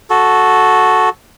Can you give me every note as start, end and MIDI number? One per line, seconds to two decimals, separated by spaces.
0.10 1.09 66
0.10 1.09 69